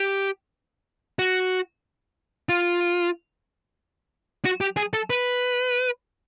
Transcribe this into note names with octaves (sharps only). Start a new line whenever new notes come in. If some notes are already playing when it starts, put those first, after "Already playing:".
Already playing: G4
F#4
F4
F#4
G4
G#4
A4
B4